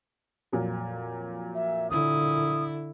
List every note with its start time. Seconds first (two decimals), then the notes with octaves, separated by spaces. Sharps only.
0.52 F2 A#2 F#3
1.55 E5
1.90 D3 E4 D#6